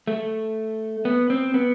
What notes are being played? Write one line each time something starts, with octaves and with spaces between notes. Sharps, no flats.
A3
B3
C4
B3